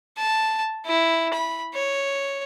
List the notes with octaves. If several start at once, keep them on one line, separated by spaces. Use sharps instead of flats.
A5
E4
B5
C#5